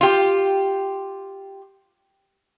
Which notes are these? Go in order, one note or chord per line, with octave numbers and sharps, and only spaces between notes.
F4 G4